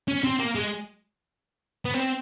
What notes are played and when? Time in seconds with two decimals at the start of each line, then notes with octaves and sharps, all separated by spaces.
0.08 C#4
0.24 C4
0.39 A#3
0.55 G#3
1.85 B3
1.94 C4